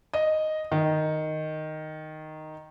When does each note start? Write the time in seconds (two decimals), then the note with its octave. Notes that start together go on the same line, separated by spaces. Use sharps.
0.14 D#5
0.72 D#3